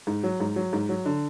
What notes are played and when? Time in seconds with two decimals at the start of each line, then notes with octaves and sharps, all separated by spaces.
0.07 G#2
0.23 F#3
0.40 G#2
0.56 F#3
0.73 G#2
0.89 F#3
1.05 D3